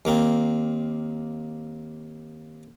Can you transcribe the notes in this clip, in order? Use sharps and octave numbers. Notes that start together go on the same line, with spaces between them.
D#2 A#3 C4